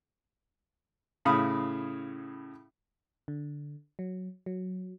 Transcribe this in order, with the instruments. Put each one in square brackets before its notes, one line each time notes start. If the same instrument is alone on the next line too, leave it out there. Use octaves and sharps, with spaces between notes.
[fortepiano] A2 C#3 F5 B5 D#6
[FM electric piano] D3
F#3
F#3